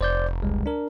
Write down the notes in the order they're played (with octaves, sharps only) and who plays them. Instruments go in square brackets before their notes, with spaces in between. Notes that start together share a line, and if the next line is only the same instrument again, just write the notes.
[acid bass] F1 [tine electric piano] C5 D5 G6
[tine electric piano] C#2 G3 G#3
D4 A#4